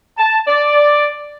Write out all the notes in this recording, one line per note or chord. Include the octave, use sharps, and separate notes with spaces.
A5
D5